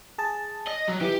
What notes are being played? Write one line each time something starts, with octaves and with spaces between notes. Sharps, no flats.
G#4 A5
D#5
F#3
E3 G4